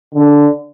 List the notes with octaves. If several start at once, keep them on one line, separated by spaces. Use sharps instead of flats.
D3